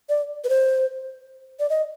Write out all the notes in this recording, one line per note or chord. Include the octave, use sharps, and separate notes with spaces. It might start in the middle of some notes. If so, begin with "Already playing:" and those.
D5
B4
C5
D5
D#5